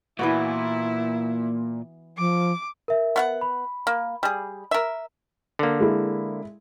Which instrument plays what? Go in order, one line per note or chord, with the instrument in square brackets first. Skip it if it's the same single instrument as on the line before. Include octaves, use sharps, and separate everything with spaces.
[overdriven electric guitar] A#2 [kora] E3 B3 F#4 [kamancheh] E4
[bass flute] F3 [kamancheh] D6
[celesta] A#4 E5
[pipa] B3 F5 F#5
[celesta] B5
[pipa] A#3
G3 G#4
A#4 E5
[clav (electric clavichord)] D3 A#3
[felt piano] G#3 E4